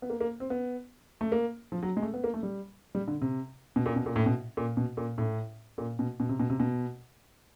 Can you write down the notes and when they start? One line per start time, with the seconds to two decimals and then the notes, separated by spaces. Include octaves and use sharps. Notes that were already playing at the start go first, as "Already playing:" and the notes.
0.02 B3
0.10 A#3
0.21 A#3
0.40 C4
0.50 B3
1.21 A3
1.32 A#3
1.72 F3
1.83 F#3
1.97 G#3
2.02 A3
2.14 B3
2.24 A#3
2.34 A3
2.43 G3
2.95 G3
3.08 D3
3.21 C3
3.76 B2
3.86 A#2
3.96 B2
4.06 A#2
4.16 A2
4.26 B2
4.57 A#2
4.77 B2
4.97 A#2
5.18 A2
5.78 A#2
5.99 B2
6.20 B2
6.29 C3
6.40 B2
6.50 C3
6.60 B2